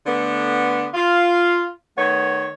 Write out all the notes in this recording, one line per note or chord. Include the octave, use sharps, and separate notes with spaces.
D3 A3 B3
F4
D#3 A3 B3 C#5